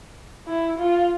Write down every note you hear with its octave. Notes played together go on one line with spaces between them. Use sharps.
E4
F4